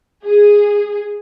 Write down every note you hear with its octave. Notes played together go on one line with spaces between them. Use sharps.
G#4